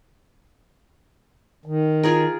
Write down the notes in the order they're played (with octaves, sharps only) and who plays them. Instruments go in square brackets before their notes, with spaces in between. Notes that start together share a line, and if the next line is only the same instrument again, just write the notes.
[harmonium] D#3
[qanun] F4 G#4 A#4